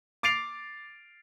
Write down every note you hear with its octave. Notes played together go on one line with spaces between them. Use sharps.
D6 A6 C7 D7 F7